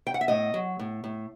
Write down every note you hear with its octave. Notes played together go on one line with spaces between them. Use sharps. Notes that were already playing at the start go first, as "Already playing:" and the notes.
G5
F#5
E5
A2 D#5
F#3
A2
A2